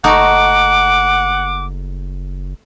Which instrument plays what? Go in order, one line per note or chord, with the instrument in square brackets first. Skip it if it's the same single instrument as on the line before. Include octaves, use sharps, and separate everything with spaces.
[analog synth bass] F#1 [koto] A3 D#4 F#4 [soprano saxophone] F#5 [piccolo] D6